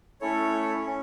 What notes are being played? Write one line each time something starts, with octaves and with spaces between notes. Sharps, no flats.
A3 C#4 E4 A4 C#5
C#4